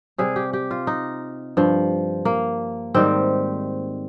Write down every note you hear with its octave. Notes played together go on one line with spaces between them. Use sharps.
C3 G3 G#4
G4
G4
F4
D#4
G2 F3
A#3
G#2 D#3 G3 C4